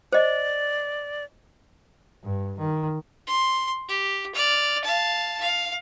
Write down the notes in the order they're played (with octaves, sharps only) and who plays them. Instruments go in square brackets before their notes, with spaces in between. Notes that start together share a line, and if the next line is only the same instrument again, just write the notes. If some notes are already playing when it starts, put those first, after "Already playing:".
[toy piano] C5 D#5 [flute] D5
[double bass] G2
D#3
[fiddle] C6
G4
D5 F6
F5 A5
F5